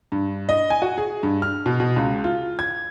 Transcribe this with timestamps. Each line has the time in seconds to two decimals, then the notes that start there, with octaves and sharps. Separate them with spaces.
0.12 G2
0.49 D#5
0.70 G#5
0.82 F#4
0.98 G#4
1.23 G2
1.42 F6
1.66 B2
1.80 B2
1.96 C#2
2.24 F4
2.59 G#6